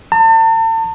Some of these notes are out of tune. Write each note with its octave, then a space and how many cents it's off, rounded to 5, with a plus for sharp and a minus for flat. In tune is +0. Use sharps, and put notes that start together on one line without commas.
A5 +40